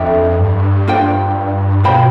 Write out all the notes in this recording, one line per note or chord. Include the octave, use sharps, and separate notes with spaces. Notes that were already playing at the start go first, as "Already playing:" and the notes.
Already playing: F2 D4 A4 E5 G5
G2
D4 F4 C5 G5
B2 F4 C5 G5 B5